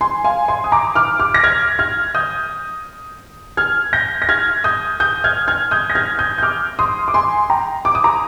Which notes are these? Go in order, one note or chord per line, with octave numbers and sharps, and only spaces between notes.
G#5 C6
F5 G#5
G#5 C6
D#6
A#5 D6
D6 F6
D6 F6
A#6
F6 G#6
F6 G#6
D#6 G6
F6 G#6
G6 A#6
A#6
F6 G#6
D#6 G6
D#6 G6
F6 G#6
F6 G#6
D#6 G6
A#6
F6 G#6
D#6 G6
G6
D6 F6
C6 D#6
D6
G#5 C6
G5 A#5
D6
D#6
A#5 D6